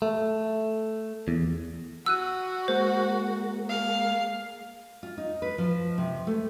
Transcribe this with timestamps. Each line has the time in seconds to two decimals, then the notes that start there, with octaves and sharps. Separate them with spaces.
0.02 A3
1.28 E2
2.06 F#4 E6 F#6 D#7
2.68 G#3 A#3 C5
3.69 F5
5.03 F4
5.18 D#4
5.42 B4
5.58 F3
5.98 C3
6.27 A3